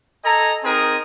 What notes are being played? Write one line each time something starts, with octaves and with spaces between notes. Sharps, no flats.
A4 D#5 G#5 A#5
C4 D#4 G#4 A#4 D#6